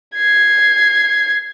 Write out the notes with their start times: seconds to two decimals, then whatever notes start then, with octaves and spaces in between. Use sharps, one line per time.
0.16 G#6 C7